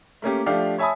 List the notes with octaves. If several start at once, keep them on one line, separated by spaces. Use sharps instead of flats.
A3 A#3 C#4 G4
F3 A3 D4 G4 F5
C#5 E5 G#5 A5 B5 D#6